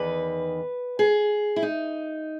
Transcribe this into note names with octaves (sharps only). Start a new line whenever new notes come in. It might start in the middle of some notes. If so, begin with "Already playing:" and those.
Already playing: E2 D#3 B4
G#4
E4
D#4